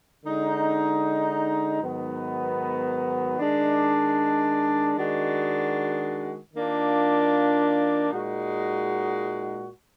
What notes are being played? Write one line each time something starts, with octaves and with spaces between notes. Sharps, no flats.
D3 G#3 D#4
G#2 D#3 F#3 B3
D#3 G#3 D4
D#3 G#3 D4 F#4
D#3 A#3 D4 F4
A#2 G#3 D#4 F#4